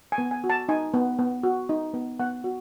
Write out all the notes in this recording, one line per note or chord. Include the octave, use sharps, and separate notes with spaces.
G#5
B3
G#5
F#4
A5
D#4 G#5
B3
B3
F#4
D#4
B3
B3 F#5
F#4